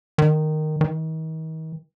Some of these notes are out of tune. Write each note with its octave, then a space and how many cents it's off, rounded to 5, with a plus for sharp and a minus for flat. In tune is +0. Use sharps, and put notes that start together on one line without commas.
D#3 -10
D#3 +40